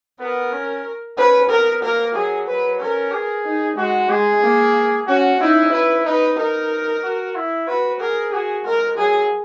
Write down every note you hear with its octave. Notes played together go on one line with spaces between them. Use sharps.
B3 A#4
C#4
C#4 B4
B3 A#4
A#3 A#4
F#3 G#4
F#3 B4
C#4 A#4
G#4
D#4
G#3 F#4
G#3 G#4
A#3
C#4 F#4
D#4 E4
E4 B4
D#4 B4
D#4 A#4
F#4
E4
F#4 B4
G#4 A#4
F#4 G#4
G#3 A#4
F#3 G#4